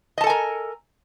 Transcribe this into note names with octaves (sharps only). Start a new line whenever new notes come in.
A4 A#4 D#5 G#5 A5